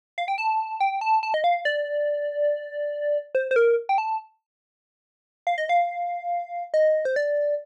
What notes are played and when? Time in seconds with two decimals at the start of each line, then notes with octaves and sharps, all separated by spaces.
0.18 F5
0.28 G5
0.38 A5
0.80 G5
1.01 A5
1.23 A5
1.34 D#5
1.44 F5
1.65 D5
3.35 C5
3.51 C5
3.56 A#4
3.89 G5
3.98 A5
5.47 F5
5.58 D#5
5.69 F5
6.74 D#5
7.05 C5
7.16 D5